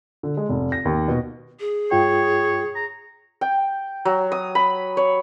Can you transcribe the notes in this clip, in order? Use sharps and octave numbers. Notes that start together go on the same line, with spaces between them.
D3
G#3
F1
A#6
D#2
B2
G#4
G2 F4 C#5 G5
A#5
G5
F#3
D#6
B5
C#5